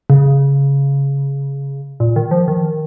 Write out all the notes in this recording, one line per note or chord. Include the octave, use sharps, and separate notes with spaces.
C#3
A#2
D#3
F3
D#3